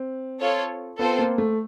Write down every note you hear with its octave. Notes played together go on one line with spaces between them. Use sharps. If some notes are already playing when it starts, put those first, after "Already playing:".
Already playing: C4
F4 A4 C#5
B3 C4 F4 A4 C5
A#3
A3